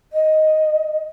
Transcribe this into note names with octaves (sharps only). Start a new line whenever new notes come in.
D#5